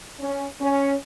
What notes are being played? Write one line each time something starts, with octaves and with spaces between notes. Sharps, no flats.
C#4
C#4